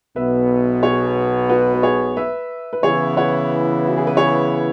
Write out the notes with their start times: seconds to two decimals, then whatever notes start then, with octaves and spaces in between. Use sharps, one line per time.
0.16 B1 B2 B3 B4 E5
0.83 G#4 C#5
1.49 F#4 B4
1.74 B4
1.83 G#4 C#5
2.17 B4 E5
2.73 B4
2.83 C#3 E3 B3 E4 G#4 C#5
3.17 C#5 F#5
3.87 F#4
3.97 G#4
4.07 B4
4.17 G#4 C#5